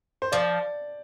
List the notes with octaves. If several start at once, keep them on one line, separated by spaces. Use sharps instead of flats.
C5
F3 D5